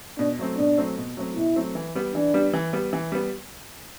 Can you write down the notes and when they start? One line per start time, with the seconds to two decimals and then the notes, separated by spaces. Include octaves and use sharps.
0.19 B2 D4
0.39 F#3 A3 C4
0.58 B2 D4
0.78 F#3 A3 C4
0.98 B2
1.17 F#3 A3 C4
1.37 B2 E4
1.56 F#3 A3 C4
1.75 E3
1.95 G3 B3
2.14 E3 D4
2.34 G3 B3
2.53 E3
2.73 G3 B3
2.93 E3
3.12 G3 B3